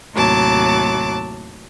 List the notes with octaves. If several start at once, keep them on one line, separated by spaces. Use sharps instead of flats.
D#2 A2 C3 F#3 A5 D6